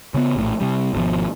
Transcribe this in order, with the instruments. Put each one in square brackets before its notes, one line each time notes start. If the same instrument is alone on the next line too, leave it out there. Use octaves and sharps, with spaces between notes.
[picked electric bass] C#3 A#3 B3
A#1 A2
C3 G3
G#1 B2 D3 F3